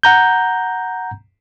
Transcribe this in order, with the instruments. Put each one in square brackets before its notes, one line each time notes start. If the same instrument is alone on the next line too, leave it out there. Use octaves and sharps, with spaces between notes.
[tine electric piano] F#5 A#5 G6